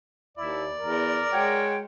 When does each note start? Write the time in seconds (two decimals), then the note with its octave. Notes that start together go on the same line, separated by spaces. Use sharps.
0.37 D#2 E4 D5
0.80 E2 A#4
1.32 G#3 F#4 C#5 G5